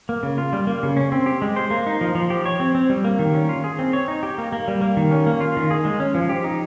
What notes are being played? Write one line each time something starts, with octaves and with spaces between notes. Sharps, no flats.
A#3
C#3
F4
G3
A#3
C#3
C#4
C4
G4
G#3
C5
A#3
D#4
F3
F3
G4
C#5
C4
C4
G3
A#3
D#3
C#4
F4
G#4
C4
C#5
D#4
G4
A#3
A#3
G3
A#3
D#3
C#4
A#3
F4
D#3
G#4
G#3
C#4
F3
G4
D#4